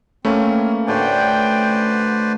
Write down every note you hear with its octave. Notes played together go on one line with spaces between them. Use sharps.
A3 A#3 C4 C#4 B4
A2 D3 F#4 B4 C5 D5 G5